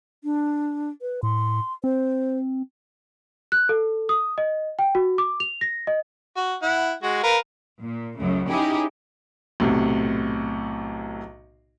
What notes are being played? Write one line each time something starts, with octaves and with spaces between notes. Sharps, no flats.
D4
B4
A2 C6
C4 C5
F#6
A4
D#6
D#5
G5
F#4
D6
F7
A#6
D#5
F#4
E4 F#5
G#3 F#4
A#4 B4 F5
A#2
C#2 F#2 C#3 A3
C#4 D#4 E4 G4 G#4
B1 A2 C3